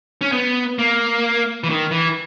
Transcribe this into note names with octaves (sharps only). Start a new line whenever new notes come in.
C#4
B3
A#3
E3
D#3
E3